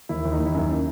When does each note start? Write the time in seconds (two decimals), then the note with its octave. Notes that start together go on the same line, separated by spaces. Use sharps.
0.09 D#2 E4
0.25 D#2
0.32 D#4
0.40 D#2
0.45 E4
0.54 F#2 D#4